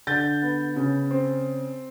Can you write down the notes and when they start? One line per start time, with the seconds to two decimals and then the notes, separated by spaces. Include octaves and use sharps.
0.07 D3 G6 A6
0.42 B3
0.76 C#3
1.11 C4